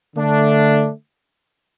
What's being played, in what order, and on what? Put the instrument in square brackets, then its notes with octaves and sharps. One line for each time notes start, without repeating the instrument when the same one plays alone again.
[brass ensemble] D3 A3 D4